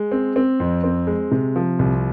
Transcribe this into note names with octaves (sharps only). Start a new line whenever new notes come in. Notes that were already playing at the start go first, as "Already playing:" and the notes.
Already playing: G#3
C4
C4
F2
C4
G#3
C3
F3
C2